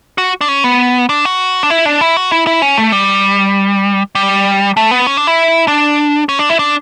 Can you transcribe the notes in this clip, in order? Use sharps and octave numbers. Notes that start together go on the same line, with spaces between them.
F#4
D4
C#4
B3
D4
F#4
D4
E4
D4
E4
F#4
E4
E4
C#4
A3
G3
G3
A3
B3
C#4
D4
E4
D4
C#4
D4
E4
D4